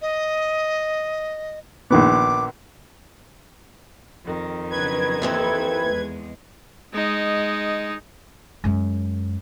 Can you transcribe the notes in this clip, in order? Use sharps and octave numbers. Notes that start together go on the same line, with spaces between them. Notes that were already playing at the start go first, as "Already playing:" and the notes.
D#5
A#1 D#3 B3 D6
F2 D#3
C#3 F#3 D4 B4 G#6
D#2 E3 A#3 C4 E4 A4
E2 G#3
G#3 D#4
F#2 G#3